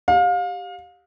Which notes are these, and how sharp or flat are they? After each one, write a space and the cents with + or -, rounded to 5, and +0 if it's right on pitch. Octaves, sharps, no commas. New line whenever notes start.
G4 +0 F5 +30